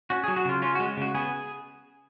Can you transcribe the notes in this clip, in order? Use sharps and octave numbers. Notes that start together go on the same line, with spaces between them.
C#4 F#4
G#4
F#3
F#4
C#3 F4
C#4 F4
F#4
G#3
C#3 F#4
B3 G#4